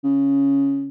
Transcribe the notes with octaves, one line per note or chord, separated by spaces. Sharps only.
C#3